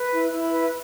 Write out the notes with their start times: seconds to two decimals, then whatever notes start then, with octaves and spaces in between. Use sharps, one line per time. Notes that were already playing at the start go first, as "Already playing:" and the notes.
Already playing: B4
0.12 E4
0.32 E4
0.52 B4